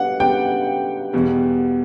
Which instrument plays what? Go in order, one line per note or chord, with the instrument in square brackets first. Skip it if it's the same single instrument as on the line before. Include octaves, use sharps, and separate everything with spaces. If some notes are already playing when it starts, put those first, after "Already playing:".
Already playing: [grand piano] G3 B3 D4 [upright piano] F#5
[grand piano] C#3 G3 B3 D4 [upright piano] G5
[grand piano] E2 B2 G3